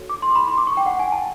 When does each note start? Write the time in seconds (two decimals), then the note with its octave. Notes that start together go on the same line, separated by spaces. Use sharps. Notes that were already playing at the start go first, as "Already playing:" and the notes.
Already playing: F#4 A4 C#5
0.09 D6
0.22 C6
0.35 B5
0.48 C6
0.58 D6
0.67 C#6
0.77 G5
0.86 F#5
0.99 G#5
1.12 A5